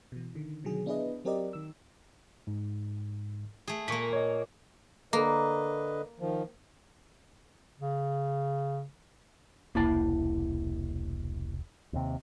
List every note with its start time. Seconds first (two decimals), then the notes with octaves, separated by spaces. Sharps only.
0.12 B2 E3
0.35 D3 D#3
0.64 B2 D3 D#3 F#3 G#4
0.86 B3 D4 E4 G#4 B4 D#5
1.25 F#3 C4 G4 A#4 D5 D#5
1.53 D#3 E6
2.47 G#2
3.68 A3 G#4
3.88 A#2 A#3 C#6 B6
4.13 C#5 D#5
5.13 D3 A#3 B4 D#5
6.20 D#3 F3
7.80 C#3
9.75 E1 C2 A#3 E4 A5
11.93 D#2 C3